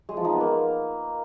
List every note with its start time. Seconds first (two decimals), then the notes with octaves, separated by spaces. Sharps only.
0.09 G#3
0.17 F3
0.25 D#4
0.33 B3
0.41 A#3